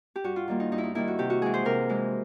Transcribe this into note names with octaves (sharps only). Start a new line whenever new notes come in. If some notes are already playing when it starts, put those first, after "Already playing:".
G4
G2 F#4
F4
D#3 G3 A#3
D#4
G2 D#4
E4
D#4
D#3 G3 A#3 E4
F#4
C3 G4
F#4
E3 G#3 G#4
C5
C3 A#4
E3 G#3